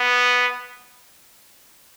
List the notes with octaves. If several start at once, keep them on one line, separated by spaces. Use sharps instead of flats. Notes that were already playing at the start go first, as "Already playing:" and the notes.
Already playing: B3